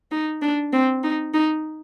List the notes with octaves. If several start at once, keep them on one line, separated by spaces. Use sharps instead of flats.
D#4
D4
C4
D#4
D#4